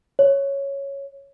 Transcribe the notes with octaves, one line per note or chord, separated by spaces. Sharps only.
C#5